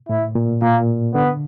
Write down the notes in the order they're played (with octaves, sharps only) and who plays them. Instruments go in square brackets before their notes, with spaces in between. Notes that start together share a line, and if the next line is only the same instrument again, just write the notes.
[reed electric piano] A2 [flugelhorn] E4
[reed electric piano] A#2
[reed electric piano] A#2 [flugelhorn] A#3
[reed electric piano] D3 [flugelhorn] B3